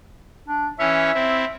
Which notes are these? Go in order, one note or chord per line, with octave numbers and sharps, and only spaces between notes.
D4
E3 C#4 C#5 E5
C4 E4